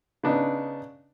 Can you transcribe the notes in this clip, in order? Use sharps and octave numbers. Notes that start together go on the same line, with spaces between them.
C#3 B3 D4 D#4